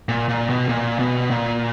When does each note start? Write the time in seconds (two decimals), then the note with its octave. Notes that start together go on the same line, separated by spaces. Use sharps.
0.09 A#2
0.29 A#2
0.50 B2
0.69 A#2
0.99 B2
1.30 A#2